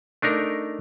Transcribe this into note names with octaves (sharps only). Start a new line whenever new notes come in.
A3 D4 D#4 A#4